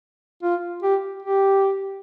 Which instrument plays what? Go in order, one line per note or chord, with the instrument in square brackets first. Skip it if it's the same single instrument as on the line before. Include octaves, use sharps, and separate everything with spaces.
[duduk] F4
G4
G4